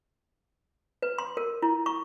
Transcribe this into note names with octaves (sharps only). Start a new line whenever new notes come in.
B4
C6
A#4
E4
C#6